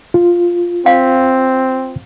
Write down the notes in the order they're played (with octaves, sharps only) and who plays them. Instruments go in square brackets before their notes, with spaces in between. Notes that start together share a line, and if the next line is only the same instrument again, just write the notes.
[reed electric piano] F4
[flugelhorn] C4 [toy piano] F5